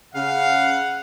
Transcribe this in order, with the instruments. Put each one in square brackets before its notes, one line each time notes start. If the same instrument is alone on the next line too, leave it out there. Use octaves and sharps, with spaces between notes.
[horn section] C#3 F5 [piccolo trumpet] F#5